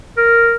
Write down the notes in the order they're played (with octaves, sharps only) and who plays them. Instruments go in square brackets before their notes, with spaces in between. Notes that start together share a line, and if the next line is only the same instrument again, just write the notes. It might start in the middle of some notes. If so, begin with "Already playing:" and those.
[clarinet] A#4